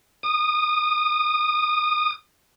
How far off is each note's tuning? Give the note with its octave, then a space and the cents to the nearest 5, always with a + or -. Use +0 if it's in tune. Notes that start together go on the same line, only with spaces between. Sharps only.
D#6 -30